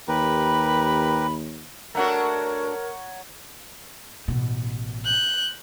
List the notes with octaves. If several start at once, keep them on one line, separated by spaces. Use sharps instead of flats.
D#2 G4 A#4 B4 B5
A3 D4 F#4 A#4 C#5 F#5 A#5
A1 B2
F#6 G6